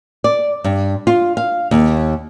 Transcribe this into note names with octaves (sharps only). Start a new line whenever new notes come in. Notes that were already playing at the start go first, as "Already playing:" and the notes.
D5
G2
F4
F5
D#2